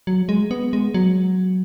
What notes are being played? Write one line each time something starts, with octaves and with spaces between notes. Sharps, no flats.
F#3
G#3
B3
G#3
F#3